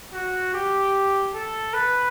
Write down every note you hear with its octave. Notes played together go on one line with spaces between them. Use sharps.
F#4
G4
A4
B4